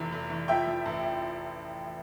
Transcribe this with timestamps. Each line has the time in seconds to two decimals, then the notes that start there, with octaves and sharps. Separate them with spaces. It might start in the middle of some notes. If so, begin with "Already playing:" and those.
Already playing: F1 E2 E3
0.12 F1
0.30 E3
0.48 F3 E5 G5
0.67 F3
0.86 A1